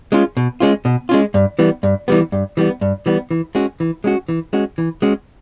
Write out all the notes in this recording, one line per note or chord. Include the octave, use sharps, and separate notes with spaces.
G#3 C#4 F4
B2
G#3 C#4 F4
B2
G#3 C#4 F4
G2
E3 G3 B3
G2
E3 G3 B3
G2
E3 G3 B3
G2
E3 G3 B3
E3
G#3 C#4 F#4
E3
G#3 C#4 F#4
E3
G#3 C#4 F#4
E3
G#3 C#4 F#4